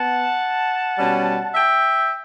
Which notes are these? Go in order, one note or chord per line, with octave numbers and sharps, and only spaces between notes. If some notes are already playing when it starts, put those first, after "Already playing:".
Already playing: B3 F#5 A5
B2 G3 C#4
E5 G5